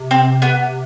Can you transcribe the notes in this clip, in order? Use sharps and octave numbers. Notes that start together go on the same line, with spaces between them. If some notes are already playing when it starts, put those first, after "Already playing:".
Already playing: C3
C4
B3